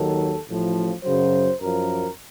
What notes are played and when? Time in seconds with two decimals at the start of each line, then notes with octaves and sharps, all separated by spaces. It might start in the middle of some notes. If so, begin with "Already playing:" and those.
Already playing: D#2 D#3 F#3 A4
0.48 A1 A2 F3
1.05 F#2 C#3 F#3 C5
1.61 F#2 F3 A#4